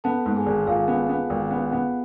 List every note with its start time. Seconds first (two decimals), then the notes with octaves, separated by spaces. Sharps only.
0.04 B3 A4 A5
0.26 G#2
0.36 G#4 G#5
0.46 G#1
0.67 G#1 F4 F5
0.88 B3
1.09 B3
1.30 G#1
1.51 B3
1.72 B3